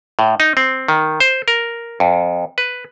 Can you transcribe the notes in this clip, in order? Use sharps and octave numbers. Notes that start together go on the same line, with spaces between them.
A2
D#4
C4
D#3
C5
A#4
F2
B4